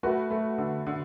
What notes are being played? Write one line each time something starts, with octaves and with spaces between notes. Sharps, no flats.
A3 F#4 B4
A3
D3
D3